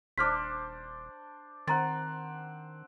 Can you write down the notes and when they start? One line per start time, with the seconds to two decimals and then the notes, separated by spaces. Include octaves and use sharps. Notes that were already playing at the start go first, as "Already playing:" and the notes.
0.18 D#1 D4 C5 D6 F6 B6
1.67 D#3 C4 F#5 A#5 A6